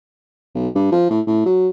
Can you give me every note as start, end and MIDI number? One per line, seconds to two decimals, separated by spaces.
0.55 0.68 35
0.75 0.92 43
0.92 1.07 53
1.10 1.21 45
1.27 1.45 45
1.46 1.68 54